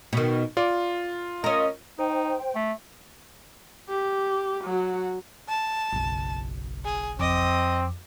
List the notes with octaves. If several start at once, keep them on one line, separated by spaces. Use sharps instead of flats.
B2 D#3
F4 D5
C#4 A#4 D#5
D#4 C5 G5
A3
G4
F#3 F#4
A5
F#1 B1
G#4
F2 C4 D#5 D6